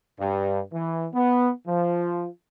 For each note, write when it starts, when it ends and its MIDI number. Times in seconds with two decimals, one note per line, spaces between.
0.19 0.60 43
0.72 1.06 52
1.14 1.50 59
1.67 2.27 53